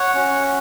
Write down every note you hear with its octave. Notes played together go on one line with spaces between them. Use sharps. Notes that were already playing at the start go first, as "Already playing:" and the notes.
Already playing: C#5 F#5
C#4 F#4